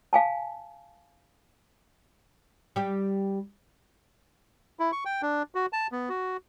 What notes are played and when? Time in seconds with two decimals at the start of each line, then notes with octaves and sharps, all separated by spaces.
0.13 F5 G#5 A5
2.76 G3 G4
4.79 E4
4.92 C#6
5.05 G5
5.22 D4
5.55 F#4
5.73 A5
5.92 B3
6.09 F#4